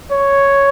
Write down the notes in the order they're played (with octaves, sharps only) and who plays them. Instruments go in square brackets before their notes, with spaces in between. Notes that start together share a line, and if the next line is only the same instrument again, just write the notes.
[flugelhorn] C#5